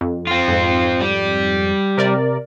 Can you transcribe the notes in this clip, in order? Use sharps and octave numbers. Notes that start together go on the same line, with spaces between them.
F2
C4 F4
F2 G#2
G3
C3 A#4 D5